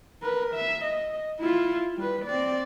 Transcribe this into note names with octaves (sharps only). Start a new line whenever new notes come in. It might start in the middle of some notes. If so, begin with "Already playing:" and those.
A#4 B4
E5
D#5
E4 F4
G3 B4
C4 D5